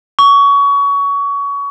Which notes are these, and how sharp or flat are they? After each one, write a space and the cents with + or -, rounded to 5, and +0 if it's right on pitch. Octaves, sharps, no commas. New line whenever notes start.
C#6 +25